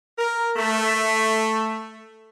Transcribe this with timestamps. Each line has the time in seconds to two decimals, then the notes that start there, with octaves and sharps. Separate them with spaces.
0.19 A#4
0.57 A3